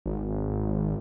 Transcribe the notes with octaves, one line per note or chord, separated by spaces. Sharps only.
G#1